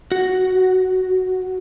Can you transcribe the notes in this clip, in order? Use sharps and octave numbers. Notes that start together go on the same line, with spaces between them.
F#4